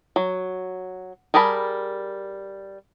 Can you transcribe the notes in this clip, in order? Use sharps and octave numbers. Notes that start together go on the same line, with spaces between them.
F#3
G3 G#4 A#4 A5 B5